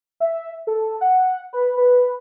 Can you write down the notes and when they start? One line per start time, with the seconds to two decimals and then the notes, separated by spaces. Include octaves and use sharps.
0.20 E5
0.67 A4
1.01 F#5
1.53 B4
1.77 B4